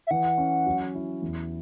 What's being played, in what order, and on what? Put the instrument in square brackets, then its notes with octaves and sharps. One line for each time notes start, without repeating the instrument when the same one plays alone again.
[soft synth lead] E5
[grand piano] E3 [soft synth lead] F#5
[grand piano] C#4
F#3
E4
E2